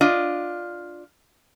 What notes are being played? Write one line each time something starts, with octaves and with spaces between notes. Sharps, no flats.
D4 F4 D#5